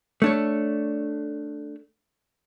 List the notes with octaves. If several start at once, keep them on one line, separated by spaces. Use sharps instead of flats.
A3 D4 C#5